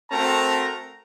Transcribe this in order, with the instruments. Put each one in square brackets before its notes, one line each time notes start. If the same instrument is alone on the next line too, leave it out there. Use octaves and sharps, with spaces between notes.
[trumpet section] A3 C4 F#4 A#4 A5 A#5